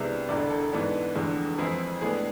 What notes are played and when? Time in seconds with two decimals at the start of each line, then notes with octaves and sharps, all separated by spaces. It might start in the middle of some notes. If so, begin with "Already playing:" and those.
Already playing: C2 C3 G#3 B3 D4 E5
0.29 E1 E2 D3 D5
0.50 A4
0.72 G#2 E3 B3 D4
1.15 F1 E2 D3 G#3
1.58 F2 E3 G#3 C4 E4 G#4
2.01 A2 G#3 B3 D4 G#4